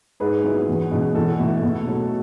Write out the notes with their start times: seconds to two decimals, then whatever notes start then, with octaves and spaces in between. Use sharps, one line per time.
0.20 G#2 G#4 B4
0.44 F#3 B3 E4
0.67 E2
0.92 B2 G#3 C#4
1.15 E2 A4
1.39 B2 A3 E4
1.62 B2
1.87 F#3 A3